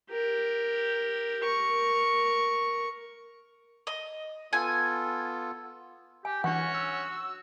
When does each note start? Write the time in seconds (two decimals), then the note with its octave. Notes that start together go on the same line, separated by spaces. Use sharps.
0.11 G4 A#4
1.43 A#4 C#6
3.87 D#5
4.53 B3 F4 A4 G#5
6.25 G4 G#5
6.44 E3 C#4 D4 F#4 C#5 F#5
6.74 E6